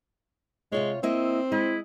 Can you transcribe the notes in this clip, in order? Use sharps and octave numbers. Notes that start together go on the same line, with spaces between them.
C3 G#3 F4 C#5
A#3 C4 E4 D#5
G#3 E4 D#5